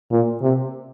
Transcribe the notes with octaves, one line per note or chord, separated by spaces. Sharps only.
A#2
C3